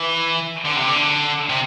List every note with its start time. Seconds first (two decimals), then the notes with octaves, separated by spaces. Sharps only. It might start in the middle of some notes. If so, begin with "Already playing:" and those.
Already playing: E3
0.65 D3
0.76 C3
0.88 D3
1.49 C3